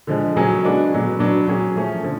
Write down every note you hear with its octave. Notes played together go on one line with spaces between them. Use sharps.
D3 F3 G#3
C#3 F#3 C#4 G#4
G#3 B3 D4 F#4 A4
B2 F#3 C#4
B2 F#3 B3 D4
F#3 C#4 G#4
F3 A3 C#4
D3 F3